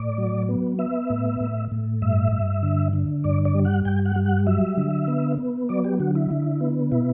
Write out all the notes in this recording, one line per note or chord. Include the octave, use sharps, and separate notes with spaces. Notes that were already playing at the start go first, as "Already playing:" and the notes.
Already playing: A2 D5
F#3
B3
B3 E5
A2
A2
A2
G2 E5
G2
D3
D3
G2 D5
D5
G3
F#5
G2 G5
F#5
G3
F#5
F#3 E5
D3
B3
B3
F#3 D5
G4
D3 F#4
E4
D3
B3
B2 E4